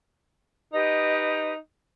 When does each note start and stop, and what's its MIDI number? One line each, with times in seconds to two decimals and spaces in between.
0.73 1.56 63
0.73 1.53 67
0.73 1.53 71
0.73 1.53 75